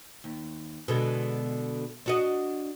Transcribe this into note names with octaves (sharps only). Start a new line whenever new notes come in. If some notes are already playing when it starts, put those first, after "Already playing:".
D#2
B2 D3 G#3
D4 F#4 D#5